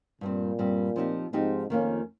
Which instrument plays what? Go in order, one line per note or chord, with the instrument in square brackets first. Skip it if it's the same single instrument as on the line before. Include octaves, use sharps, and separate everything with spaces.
[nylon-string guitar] G2 G3 C4 [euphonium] A#2
[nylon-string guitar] G2 G3 C4
F3 C4 D#4 G4
[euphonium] G#2 [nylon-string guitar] F3 C4 D#4 G4
[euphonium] F2 [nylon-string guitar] D#3 A#3 C#4 F4